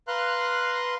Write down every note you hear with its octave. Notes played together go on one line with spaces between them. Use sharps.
B4 F5 A#5 C6 F#6